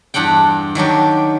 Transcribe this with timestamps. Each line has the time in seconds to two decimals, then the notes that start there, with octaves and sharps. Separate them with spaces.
0.14 E2 G2 D4 F#5 G5
0.75 D#3 F#3 D4 G4